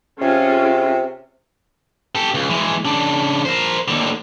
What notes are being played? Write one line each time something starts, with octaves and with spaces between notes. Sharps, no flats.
C3 C#4 F4 G#4
G4 A4
C#2
E3 G#3
C#3 D4
A#4 C5
D#2 D3